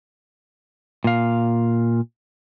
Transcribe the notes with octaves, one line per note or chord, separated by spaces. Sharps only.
A#2 F5